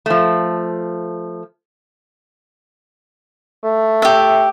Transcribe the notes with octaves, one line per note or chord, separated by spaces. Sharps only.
F3 A3
A3
G4 E5